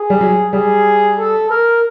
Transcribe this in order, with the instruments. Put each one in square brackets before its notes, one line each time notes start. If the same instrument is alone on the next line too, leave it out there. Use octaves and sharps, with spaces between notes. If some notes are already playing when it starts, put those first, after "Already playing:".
Already playing: [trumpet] G#4
[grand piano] G3
F#3
[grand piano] G3 [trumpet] G#4
[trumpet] A4
A#4